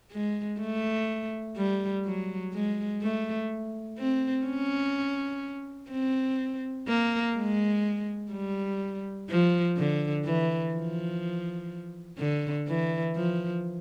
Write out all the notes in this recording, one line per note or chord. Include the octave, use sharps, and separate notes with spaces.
G#3
A3
G3
F#3
G#3
A3
C4
C#4
C4
A#3
G#3
G3
F3
D3
E3
F3
D3
E3
F3